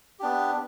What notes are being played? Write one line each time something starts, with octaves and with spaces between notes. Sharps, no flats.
B3 D4 G4